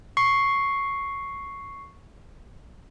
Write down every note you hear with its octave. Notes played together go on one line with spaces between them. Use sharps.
C#6 C7